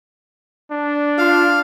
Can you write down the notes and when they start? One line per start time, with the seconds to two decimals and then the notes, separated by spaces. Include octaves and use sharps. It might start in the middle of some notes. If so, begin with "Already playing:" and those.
0.71 D4
1.18 F4 F5